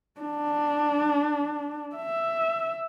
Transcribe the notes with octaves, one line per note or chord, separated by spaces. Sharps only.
D4
E5